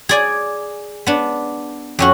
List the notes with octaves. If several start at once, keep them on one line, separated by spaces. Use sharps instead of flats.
G#4 D5 G#5
B3 D4
F2 C#4 F#4